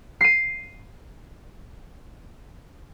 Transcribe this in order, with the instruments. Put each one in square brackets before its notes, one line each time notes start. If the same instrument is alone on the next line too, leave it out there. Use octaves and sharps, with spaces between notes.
[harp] C7 D#7